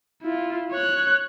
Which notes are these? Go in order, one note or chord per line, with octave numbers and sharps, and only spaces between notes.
E4 F4
C#5 F#6